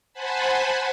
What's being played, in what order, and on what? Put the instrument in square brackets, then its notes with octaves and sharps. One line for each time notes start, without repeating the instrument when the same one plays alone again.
[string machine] C5 F#5 G#5 A5 B5